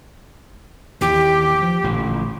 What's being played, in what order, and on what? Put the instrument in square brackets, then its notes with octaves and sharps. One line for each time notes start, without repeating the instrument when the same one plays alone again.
[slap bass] D#2 E3 [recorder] G4
[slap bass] F3
A1 A#2 D3